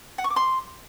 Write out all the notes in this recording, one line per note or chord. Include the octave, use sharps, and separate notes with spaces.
F#5
C#6
D6
C6